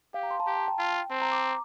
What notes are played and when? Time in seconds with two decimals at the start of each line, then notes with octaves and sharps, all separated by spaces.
0.14 G4 F5
0.23 A#5
0.31 C6
0.40 A5
0.46 G4 A#5
0.57 A5
0.68 G5
0.79 F4
1.10 C4 A5
1.22 A#5
1.32 D6